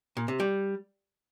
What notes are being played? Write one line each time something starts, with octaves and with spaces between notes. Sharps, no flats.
A#2
C3
G3